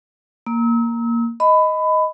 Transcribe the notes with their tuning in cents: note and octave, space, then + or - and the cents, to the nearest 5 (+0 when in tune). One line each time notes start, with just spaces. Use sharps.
A#3 +0 E6 -35
D#5 +5 B5 +20